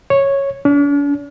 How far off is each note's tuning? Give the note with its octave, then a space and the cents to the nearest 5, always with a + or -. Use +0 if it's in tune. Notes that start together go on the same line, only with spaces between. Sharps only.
C#5 -5
D4 -45